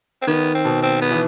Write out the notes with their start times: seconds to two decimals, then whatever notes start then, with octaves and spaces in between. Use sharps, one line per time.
0.22 C4
0.27 D#3 B3
0.55 C4
0.65 B2
0.82 C4
1.01 B3
1.11 E3